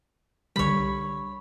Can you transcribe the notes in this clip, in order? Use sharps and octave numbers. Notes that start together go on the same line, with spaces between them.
C2 D3 G3 C#5 B5